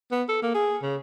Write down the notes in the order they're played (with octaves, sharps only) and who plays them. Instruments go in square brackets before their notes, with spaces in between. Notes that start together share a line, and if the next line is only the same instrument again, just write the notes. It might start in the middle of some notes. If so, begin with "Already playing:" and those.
[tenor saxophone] B3
A4
A#3
G#4
C#3